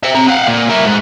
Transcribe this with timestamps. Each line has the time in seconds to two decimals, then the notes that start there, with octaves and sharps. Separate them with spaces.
0.04 C5 E5
0.15 C4 A#5
0.29 F5 F#5
0.47 A#2
0.70 E4 A#4
0.85 G#2